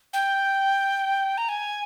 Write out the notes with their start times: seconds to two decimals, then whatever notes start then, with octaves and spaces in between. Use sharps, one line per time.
0.13 G5
1.38 A#5
1.49 G#5